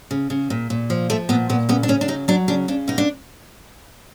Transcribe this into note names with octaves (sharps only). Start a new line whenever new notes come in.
C#3
C#3
A#2
A#2
F3
F3 A3
A#2 B3
A#2 B3
C#3 B3
D4
C#3 C#4
D4
F#3 D#4
F#3 D4
C#3 D4
C#3 D4
B2 D#4
D4